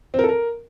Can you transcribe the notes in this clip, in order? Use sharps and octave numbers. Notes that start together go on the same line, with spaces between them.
C4
A#4
A4
A#4